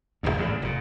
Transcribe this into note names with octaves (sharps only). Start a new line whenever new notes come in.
D#1 G#1 E2 G2
A1 E2 G#2 C#3
F1 A#2